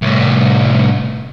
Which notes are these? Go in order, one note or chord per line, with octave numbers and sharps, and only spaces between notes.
C2 A2